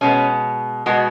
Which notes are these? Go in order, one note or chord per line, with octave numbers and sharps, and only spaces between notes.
B2 G#3 B3 C#4
B2 G#3 B3 F#4